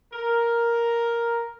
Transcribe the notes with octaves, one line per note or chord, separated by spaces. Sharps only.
A#4